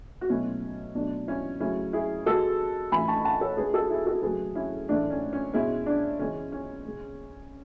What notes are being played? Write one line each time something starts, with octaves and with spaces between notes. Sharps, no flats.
F#4
B2 F#3 A3 C#4 E4
B2 F#3 A3 D4
C#4 E4
C#3 F#3 A3 C#4 E4
E4 G#4
C#3 G#3 F#4 A4
A2 E3 A3 G#5 B5
A5 C#6
F#5 A5
A4 C#5
C#3 G#3 G#4 B4
F#4 A4
E4 G#4
F#4 A4
C#3 F#3 A3 G#4 B4
C#4 E4
A2 E3 A3 D4
C#4
C#4
B2 G#3 C#4 E4
D4
C#3 E3 G#3 C#4
C#4
C#3 G#3